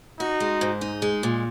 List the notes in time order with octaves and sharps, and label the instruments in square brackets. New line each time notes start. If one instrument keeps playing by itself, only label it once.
[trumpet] D#4 [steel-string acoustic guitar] F#4
[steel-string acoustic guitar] G#3
G#2
D#4
G#3
A#2